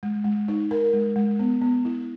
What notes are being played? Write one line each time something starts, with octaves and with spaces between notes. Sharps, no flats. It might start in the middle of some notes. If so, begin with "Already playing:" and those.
G#3
G#3
D#4
A#4
G#3
G#3
B3
B3
E4